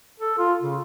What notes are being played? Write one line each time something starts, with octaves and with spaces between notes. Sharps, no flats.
A4
F4
C#3